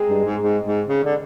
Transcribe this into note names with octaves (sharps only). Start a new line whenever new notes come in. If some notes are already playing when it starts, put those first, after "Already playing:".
Already playing: G#3 C4 D#4 G#4
G2
G#2
G#2
G#2
C#3
D3